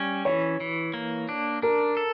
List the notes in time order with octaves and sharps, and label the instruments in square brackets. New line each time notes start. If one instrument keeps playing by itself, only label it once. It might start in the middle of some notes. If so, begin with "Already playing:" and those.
Already playing: [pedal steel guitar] G3 C#4
[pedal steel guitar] E3 [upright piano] C#5
[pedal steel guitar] E3
A#3
D4
[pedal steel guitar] D4 [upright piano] A#4
[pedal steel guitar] A4